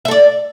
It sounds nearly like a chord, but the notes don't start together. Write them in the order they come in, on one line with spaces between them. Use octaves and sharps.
E5 A4 D5